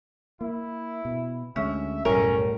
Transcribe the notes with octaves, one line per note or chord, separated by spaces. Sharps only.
A#3 E4
B2
D2 G#3 C#4 E5
B1 F#2 A2 G3 A3 C#4 A#4